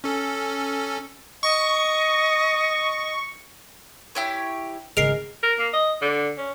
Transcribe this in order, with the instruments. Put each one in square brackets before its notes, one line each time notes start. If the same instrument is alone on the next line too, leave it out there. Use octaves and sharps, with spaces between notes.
[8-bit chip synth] C#4 A4
[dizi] D#5 [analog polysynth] C#6
[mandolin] E4 G4 C#5
[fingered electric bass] G#1 C#3 [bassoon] G#3 [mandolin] A#4 [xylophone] C7 D7 F7
[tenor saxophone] A#4
A#3
D#5
D3
C#4